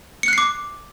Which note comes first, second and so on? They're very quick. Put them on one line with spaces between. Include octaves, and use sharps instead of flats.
C#7 F#6 C7 D6